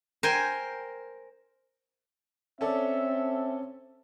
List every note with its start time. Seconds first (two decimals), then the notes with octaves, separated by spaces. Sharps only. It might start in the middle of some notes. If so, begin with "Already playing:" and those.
0.23 A#4 C5 G5 G#5
2.61 C4 C#4 A4 D5 E5